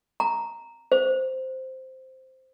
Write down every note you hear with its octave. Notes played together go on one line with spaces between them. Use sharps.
A#5
C5